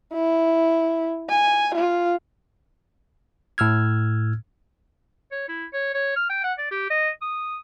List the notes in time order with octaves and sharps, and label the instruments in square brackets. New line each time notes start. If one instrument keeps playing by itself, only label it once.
[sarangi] E4
G#5
F4
[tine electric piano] A2 E6 F6 G#6
[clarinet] C#5
E4
C#5
C#5
F6
G5
F#5
D5
G4
D#5
D#6